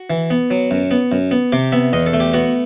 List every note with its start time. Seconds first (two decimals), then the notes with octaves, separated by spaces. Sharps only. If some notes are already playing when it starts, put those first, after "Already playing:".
Already playing: F#4
0.10 E3
0.30 B3
0.51 F#3
0.71 F#2
0.91 B3
1.12 F#2
1.31 B3
1.52 C3 G4
1.72 B3 E5
1.93 E2 D#5
2.06 A4
2.13 A3
2.20 G4
2.33 B3 F#4